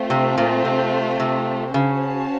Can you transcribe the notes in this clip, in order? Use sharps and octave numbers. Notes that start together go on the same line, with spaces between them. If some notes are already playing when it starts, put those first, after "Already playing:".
Already playing: A3 C4 F4
C3
A#2
C3
C3
C#3 C#4 F#4 C5 F5 A5